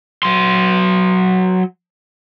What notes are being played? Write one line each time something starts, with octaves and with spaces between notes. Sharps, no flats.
F#3 C6